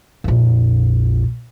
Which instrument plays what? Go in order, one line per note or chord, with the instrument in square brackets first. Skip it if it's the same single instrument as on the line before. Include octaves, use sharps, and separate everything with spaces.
[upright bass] A#1 F2